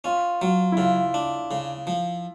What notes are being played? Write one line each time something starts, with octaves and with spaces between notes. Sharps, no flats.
C#4 F4
F#3 F4
E4
C#3 F4
D4
C#3
F3